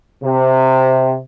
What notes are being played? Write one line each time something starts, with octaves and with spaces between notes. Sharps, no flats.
C3